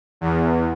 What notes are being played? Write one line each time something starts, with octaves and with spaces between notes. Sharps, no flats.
E2